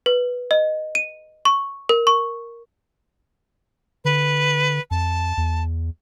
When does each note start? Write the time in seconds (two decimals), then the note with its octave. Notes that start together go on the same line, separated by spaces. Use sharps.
0.06 B4
0.51 D#5
0.95 D#7
1.45 C#6
1.89 A#4
2.07 C#6
4.05 D3 B4
4.91 F2 A5
5.37 E2